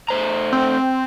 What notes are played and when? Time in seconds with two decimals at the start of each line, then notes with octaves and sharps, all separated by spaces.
0.09 A3 C5 A#5
0.52 C4